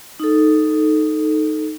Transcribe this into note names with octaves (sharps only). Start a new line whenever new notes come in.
D#4 A4